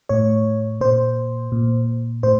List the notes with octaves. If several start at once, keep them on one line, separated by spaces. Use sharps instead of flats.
A2 C#5
A#2 C5
A#2
A2 C5